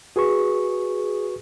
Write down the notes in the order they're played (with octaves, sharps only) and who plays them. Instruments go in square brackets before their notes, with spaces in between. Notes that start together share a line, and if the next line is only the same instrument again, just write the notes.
[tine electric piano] F#4 B4 C#6 [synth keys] G#4